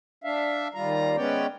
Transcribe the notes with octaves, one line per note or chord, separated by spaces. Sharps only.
D4 E5 F5
D#2 G3 F4 A#5
G#3 B3 C#4 C#5 D5 G5